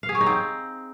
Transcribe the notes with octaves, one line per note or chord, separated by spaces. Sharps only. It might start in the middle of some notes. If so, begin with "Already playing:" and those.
F5
G#4
C#5
D#4
C4